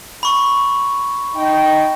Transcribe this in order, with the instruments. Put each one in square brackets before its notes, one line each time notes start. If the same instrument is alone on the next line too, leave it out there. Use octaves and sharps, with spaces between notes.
[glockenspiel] B5 C#6
[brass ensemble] D#4 G5